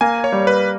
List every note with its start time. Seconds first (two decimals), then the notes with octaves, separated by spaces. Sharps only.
0.01 A#3 G#5
0.24 C#5
0.32 G3
0.47 B4